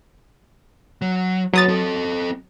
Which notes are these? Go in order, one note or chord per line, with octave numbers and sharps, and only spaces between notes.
F#3
F#3 G#4 B4 D#6 A6
C4 A4